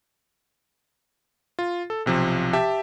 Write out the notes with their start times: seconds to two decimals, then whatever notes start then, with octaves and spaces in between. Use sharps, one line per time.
1.59 F4
1.90 A4
2.06 B1 C3 F3
2.53 G4 E5 A5